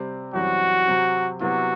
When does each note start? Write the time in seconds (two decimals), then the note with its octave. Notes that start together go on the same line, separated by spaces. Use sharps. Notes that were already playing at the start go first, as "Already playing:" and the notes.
Already playing: C3 G3 C4
0.33 F#2 E3 G3 C4 F#4
0.87 C3 F#3 C4
1.40 C3 F#3 B3 E4 F#4